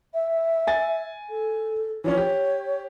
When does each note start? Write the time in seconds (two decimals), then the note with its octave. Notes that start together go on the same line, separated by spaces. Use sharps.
0.14 E5
0.67 G#5 A6
1.29 A4
2.04 E3 F3 C#4 C#5
2.18 G4